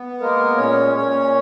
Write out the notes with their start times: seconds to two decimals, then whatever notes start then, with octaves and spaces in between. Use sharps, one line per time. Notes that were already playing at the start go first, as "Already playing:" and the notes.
Already playing: B3
0.20 G#3 A#3 A#4
0.57 A#2 C#4 C#5
0.94 A#2 C#4 C#5